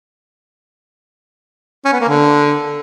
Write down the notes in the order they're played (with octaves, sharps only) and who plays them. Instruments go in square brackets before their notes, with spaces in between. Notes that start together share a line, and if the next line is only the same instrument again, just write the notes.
[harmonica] C#4
B3
A#3
D3